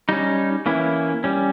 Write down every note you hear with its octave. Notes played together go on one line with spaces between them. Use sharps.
G3 C#4 D#4
E3 A#3 C#4 E4
G3 C#4